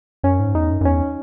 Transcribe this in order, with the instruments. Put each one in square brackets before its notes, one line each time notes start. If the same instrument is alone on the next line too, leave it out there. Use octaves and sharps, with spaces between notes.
[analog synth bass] F#2 [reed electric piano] C#4
[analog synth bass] G#2
[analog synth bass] E2 [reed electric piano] D#4
[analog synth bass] F#2
F#2
[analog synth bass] E2 [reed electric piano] C#4